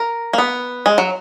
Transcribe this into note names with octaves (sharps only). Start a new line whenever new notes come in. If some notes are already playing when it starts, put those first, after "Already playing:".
Already playing: A#4
A#3
B3
G#3
F#3